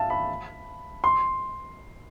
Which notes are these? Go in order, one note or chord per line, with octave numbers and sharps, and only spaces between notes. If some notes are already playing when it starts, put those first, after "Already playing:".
Already playing: E5 F5 A5
B5
C6